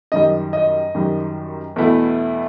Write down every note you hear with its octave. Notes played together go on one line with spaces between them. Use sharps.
F#2 D#3 G3 D#5
D#5
F#2 D#3 G3
E2 B2 A3 E4